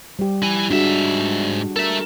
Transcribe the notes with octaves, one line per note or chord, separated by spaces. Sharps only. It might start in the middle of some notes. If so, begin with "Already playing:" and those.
G3 G4
E4 G#5
G#2 D4 F#4 G#4 E5
A4 A#4 E5